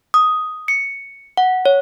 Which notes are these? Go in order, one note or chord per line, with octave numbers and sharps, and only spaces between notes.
D#6
C#7
F#5
C#5